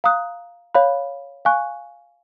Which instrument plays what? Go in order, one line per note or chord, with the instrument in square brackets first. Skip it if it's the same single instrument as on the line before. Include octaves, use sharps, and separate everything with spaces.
[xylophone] F5 A#5 D#6 F#6
C#5 F5 B5 F#6
F5 G#5 C#6 F#6